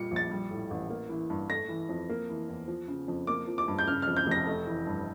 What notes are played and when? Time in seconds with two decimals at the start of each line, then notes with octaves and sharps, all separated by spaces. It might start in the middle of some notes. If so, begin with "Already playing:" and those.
Already playing: A#2 G3 C#7
0.11 A#1
0.16 A6
0.31 G3
0.51 A2
0.71 A1
0.90 A#3
1.09 E3
1.30 G2
1.50 A3 A#6
1.69 E3
1.89 F2
2.09 A#3
2.29 E3
2.49 E2
2.68 F3
2.88 C#3
3.08 F2
3.27 A#3 D6
3.47 F3
3.58 D6
3.68 G2
3.79 G6
3.87 C#3 F6
4.02 F2 F6
4.17 G6
4.27 F1 A#6
4.46 A3
4.67 E3
4.87 G2